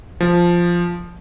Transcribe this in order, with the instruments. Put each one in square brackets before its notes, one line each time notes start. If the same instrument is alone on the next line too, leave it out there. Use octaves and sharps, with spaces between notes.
[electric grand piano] F3